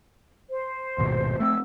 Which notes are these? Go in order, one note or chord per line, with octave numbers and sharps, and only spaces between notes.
C5
D#1 G#1 B2
A3 C4 E6